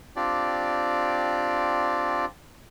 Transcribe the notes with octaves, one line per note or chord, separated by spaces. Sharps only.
C4 D4 F4 G4 D5